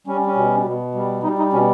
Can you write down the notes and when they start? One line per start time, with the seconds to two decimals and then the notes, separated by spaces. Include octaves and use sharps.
0.07 G3 C#4
0.26 C#4
0.36 B2
0.66 B2
0.95 G3
1.23 G3 D#4
1.38 D#4
1.53 B2 C#4